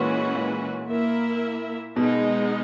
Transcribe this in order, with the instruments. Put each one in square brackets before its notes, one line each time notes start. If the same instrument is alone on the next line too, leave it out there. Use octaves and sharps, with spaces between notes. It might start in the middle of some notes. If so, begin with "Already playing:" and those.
Already playing: [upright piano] A#2 [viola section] E3 G#3 C#4 F#4 B4
[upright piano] A#2
[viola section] A#3 E4 A#4 E5
[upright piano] B2 [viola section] G#3 B3 D#4